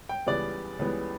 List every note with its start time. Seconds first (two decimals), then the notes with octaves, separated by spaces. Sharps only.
0.09 G5
0.26 C#2 C#3 E3 G3 B3 D5
0.79 C#2 C#3 E3 G3 B3